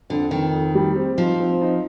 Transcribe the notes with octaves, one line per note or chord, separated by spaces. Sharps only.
F2 D3
F2 D#3
F2
G3
C4
F3 D#4
C4
D#4